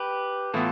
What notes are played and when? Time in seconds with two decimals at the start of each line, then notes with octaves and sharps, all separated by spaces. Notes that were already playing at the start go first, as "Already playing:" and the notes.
Already playing: G4 B4
0.54 A2 E3 B3 F4 A4